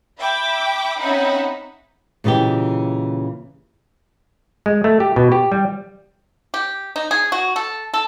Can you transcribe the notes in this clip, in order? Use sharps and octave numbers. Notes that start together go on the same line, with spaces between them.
E5 G5 B5 D6
C4 C#4 D#4 E5 F#5 B5
A#2 C#3 E3 D#4 G4
G#3
A3
G4
B2
G4
G3
G4
D#4
G#4
F#4
A4
A4